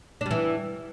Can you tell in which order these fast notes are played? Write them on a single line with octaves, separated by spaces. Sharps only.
D4 G3 E3